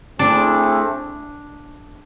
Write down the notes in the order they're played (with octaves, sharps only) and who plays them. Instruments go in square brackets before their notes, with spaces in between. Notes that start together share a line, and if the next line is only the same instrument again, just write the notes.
[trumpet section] A3 C4 E4 G#4 [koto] D4